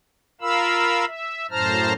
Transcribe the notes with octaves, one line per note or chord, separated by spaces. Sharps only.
F4 A#4 F5 B5 E6
E5
F#2 A2 C5 A5 A#5 F6